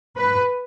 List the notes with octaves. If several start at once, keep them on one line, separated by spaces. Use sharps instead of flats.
B4